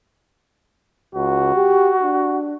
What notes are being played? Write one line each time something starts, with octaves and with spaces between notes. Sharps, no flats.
C#2 F#4
G4
D4